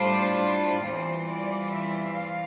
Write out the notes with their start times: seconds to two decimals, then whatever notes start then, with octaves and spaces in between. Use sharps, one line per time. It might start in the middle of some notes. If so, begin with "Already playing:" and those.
Already playing: A2 G3 D4 F4 C5
0.83 E2 E3 G3 C4 F4 C5
1.26 D5
1.70 E5
2.13 F5